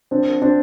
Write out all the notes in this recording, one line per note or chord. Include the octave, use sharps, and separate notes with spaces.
C4 D4
C4 D4